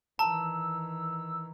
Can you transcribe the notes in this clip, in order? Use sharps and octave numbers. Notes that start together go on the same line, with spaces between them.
D#3 E3 A5 A#5 E6